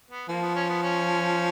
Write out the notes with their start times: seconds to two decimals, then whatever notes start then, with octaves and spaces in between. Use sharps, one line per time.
0.10 B3
0.28 F3 A#3
0.42 B3
0.55 C#4
0.69 B3
0.83 C#4